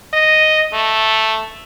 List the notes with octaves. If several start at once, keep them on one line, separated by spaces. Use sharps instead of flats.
D#5
A3